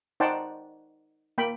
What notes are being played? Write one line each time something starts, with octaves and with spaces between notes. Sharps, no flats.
D#4 C5 D5 F#5 G5 A5
A#3 G5 B5